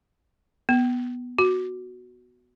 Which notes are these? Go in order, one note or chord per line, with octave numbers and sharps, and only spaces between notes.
B3
F#4